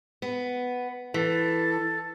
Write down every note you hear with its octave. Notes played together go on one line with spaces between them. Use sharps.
B3
E3 A4